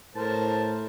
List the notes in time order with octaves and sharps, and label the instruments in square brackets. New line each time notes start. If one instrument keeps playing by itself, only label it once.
[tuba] A2 [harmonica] A#4 C5 [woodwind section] A5